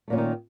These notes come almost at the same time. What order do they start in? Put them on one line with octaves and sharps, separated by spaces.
A3 A#2 F#3 C#4 D#3